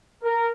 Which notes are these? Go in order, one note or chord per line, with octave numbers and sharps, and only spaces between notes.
A#4